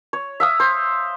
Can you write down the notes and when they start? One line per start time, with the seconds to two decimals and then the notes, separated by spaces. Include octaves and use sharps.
0.13 C#5
0.40 E5 F5 D#6
0.60 C5